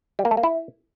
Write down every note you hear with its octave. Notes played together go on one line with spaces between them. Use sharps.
G3
A#3
A3
A#3
E4